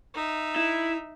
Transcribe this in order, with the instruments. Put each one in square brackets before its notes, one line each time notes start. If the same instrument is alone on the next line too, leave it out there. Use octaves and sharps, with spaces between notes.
[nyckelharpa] D#4 E5
[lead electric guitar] E4